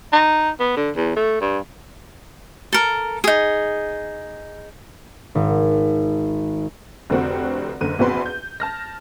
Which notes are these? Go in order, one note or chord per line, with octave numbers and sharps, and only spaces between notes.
D#4
B3
D3
E2
A3
G2
A4 A#4
D#4 G#4
G#1
F1 D3 C4 F#4 F#5
F#1 D3 D#7
A#1 E2 C4 F#4 B4 C6
G6
A5 F6 A#6